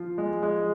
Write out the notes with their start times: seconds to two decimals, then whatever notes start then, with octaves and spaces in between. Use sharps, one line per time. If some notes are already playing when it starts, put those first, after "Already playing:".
Already playing: F3 F4
0.18 G#3
0.43 G#3